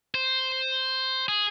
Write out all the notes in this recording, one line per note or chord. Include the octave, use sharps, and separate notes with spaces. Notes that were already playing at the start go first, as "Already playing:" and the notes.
C5
G#4